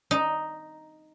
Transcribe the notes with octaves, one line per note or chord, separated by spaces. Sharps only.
D#4